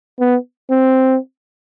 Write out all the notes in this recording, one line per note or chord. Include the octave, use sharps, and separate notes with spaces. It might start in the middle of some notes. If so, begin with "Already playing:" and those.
B3
C4